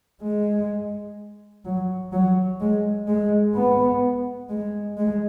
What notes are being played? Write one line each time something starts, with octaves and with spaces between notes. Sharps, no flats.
G#3
F#3
F#3
G#3
G#3
B3
G#3
G#3